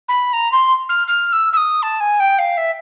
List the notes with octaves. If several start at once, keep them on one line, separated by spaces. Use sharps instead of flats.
B5
A#5
C6
F6
F6
E6
E6
D#6
A5
G#5
G5
F5
E5